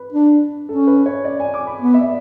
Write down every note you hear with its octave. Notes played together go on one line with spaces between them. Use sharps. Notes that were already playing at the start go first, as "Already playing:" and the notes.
Already playing: B4
D4
C#4 A4
B4
C#5
D5
G#5
D6
B5
B3
E5
D5